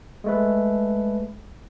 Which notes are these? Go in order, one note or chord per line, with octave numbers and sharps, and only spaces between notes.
G#3 A3 B4